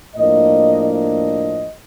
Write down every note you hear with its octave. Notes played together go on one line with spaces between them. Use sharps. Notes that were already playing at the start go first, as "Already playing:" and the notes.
A2 F3 A#3 D4 D#5
D#5